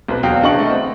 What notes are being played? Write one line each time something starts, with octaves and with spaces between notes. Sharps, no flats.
B1 C4 B4
E2 B2 F#3 F5 G5
C#3 D4 D#5 F#5 C#6 F#7
A3 B3
C4